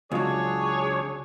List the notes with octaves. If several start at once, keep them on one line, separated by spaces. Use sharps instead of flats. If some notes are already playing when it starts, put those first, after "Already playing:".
C#2 F#3 D4 G#4 C#5